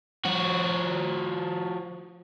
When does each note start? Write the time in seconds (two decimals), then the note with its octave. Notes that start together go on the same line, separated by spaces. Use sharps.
0.25 F3 F#4